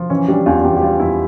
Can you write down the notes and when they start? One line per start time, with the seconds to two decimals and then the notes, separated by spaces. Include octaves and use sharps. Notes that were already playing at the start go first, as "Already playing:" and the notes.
Already playing: F3
0.10 E3 C#4
0.28 G3 D4
0.46 E2 F4
0.64 E2 G4
0.77 G4
0.81 G3 F4
1.00 E2 E4